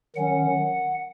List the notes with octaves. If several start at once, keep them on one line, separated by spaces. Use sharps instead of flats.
D#3 F#3 C#4 F#5